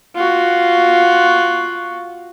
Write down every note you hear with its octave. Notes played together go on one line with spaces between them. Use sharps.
F4 F#4